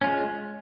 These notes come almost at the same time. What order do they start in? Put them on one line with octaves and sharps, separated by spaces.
C#4 F4 G#3